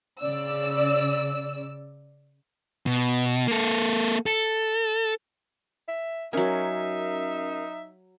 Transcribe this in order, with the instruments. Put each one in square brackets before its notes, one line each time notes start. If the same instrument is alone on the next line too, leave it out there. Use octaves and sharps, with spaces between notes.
[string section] C#3 D5 E6
[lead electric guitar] B2
A#3 A4
A4
[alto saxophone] E5
[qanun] F#3 G#5 [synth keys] C#4 A#4 [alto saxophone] D#4 [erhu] E5